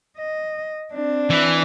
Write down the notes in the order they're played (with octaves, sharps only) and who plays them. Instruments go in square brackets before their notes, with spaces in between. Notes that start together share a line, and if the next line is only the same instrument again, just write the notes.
[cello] D#5
C4 D4
[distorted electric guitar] E3